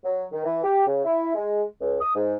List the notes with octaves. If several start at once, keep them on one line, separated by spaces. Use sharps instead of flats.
F#3
D#3
E3
G4
C#3
E4
G#3
C#2
D#6
G#2